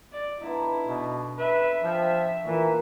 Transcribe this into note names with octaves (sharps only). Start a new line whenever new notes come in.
D5
D3 B3 D#4 E4
B2
B4 E5
F3 A4 G5 C#6
A#2 E3